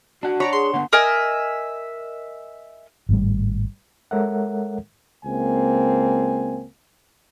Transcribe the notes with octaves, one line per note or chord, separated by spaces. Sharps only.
D4 F#4 F#5
C#5 D5 A#5 B5
G#4 C6
D3 B3 F#5
A#4 D#5 E5 G#5
G#1 A2 G3
G#3 A4 A#4 C#5 E5 F#5
C#2 A#3 C4 G#5